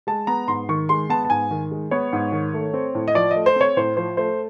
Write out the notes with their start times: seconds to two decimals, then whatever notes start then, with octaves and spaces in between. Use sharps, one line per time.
0.07 G#3 A5
0.27 B3 A#5
0.48 G#2 C6
0.69 D#3 C#6
0.89 G#3 C6
1.10 B3 A5
1.25 A5
1.30 G#2 G#5
1.51 D#3
1.71 G#3
1.91 B3 C#5
2.13 G#2
2.32 D#3
2.54 A3
2.74 C4
2.95 A2
3.08 D#5
3.15 F3 D5
3.31 A3 D#5
3.46 C5
3.56 C4 C#5
3.77 A2 C5
3.97 F3 C5
4.17 A3 C5